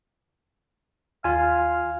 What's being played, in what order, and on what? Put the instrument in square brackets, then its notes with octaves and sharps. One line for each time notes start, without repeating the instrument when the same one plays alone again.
[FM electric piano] D#2 [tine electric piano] F4 G#5 [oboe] F5